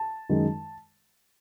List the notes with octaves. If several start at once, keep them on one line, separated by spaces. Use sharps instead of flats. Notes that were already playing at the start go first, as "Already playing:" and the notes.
Already playing: A5
F#2 D#3 G#3